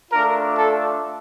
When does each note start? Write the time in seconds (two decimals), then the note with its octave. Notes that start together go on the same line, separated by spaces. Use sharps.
0.11 A3 D4 F4 A#4
0.56 A4